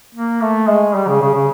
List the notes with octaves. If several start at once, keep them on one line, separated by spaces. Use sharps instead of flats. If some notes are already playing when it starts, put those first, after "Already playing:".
A#3
A3
G#3
G3
C#3
C#3
C#3